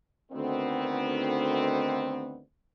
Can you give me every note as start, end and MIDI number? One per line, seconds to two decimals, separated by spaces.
0.32 2.40 38
0.32 2.40 51
0.32 2.40 59
0.32 2.40 60